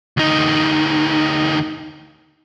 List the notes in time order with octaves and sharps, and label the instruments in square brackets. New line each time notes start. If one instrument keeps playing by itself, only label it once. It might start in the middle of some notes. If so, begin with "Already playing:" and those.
[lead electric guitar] D2 D#4